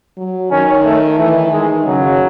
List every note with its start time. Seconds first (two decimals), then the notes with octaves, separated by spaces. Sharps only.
0.17 F#3
0.51 D#3 C#4
0.85 A3
1.19 E3 A3
1.52 D#3 G#3
1.86 C#3 F#3